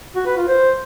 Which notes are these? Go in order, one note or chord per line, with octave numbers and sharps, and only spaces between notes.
F#4
B4
F4
C5